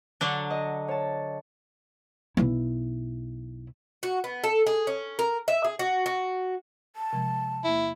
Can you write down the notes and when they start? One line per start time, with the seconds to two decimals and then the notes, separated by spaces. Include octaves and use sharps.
0.21 D3 F#3 D4
0.50 D#5
0.88 C#5 A5
2.37 B1 E4
4.03 F#4
4.24 B3
4.44 A4
4.67 G#4
4.87 C#4
5.19 A#4
5.48 E5
5.64 G#4
5.79 F#4
6.06 F#4
6.96 A5
7.13 C3 F3 G#3
7.64 E2 A#3 E4